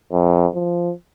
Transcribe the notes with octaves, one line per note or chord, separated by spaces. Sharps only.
F2
F3